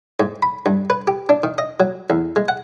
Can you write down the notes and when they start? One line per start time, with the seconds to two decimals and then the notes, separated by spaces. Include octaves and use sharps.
0.20 G#2
0.42 B5
0.66 G2
0.90 B4
1.07 G4
1.29 D4
1.43 D#3
1.58 D#5
1.80 F#3
2.10 E2
2.36 G#3
2.48 F#5